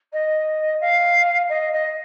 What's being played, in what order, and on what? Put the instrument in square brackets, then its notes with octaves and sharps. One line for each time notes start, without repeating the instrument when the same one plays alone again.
[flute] D#5
F5
D#5
D#5